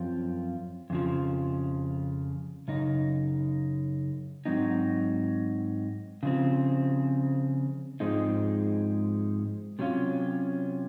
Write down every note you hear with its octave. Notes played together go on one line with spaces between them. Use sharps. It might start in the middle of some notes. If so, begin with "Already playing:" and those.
Already playing: F#2 F3 C4 F4
F2 C#3 F3
F#2 C#3 D#4
G#2 F#3 C4 D#4
C#3 F3 C4
G#2 F3 G#3 C4 D#4
C3 F#3 C#4 F4